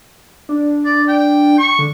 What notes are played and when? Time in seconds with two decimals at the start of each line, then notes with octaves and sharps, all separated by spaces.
0.49 D4
0.85 D5
1.08 G5
1.58 C#6
1.79 D3